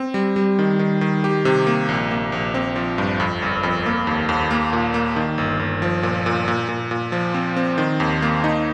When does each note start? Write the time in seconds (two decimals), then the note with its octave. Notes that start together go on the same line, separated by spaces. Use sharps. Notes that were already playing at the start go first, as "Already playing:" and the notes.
Already playing: C4
0.14 G3
0.36 G3
0.59 D#3
0.79 D#3
1.01 D#3
1.24 G4
1.45 C3
1.67 A#3
1.89 A#1
2.11 A#3
2.32 A#1
2.54 C4
2.76 F3
2.98 G2
3.20 F2
3.42 G1
3.63 F2
3.86 A#3
4.07 D#2
4.29 D#2
4.51 A#3
4.73 A#2
4.94 A#3
5.16 D#3
5.38 G1
5.59 G1
5.82 F3
6.03 A#2
6.26 A#2
6.48 A#2
6.69 A#2
6.91 A#2
7.12 F3
7.34 C4
7.56 C4
7.78 D#3
8.00 D#2
8.22 A#3
8.44 D#4